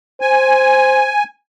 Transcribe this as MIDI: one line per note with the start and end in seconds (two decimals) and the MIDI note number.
0.21 1.12 72
0.21 1.24 80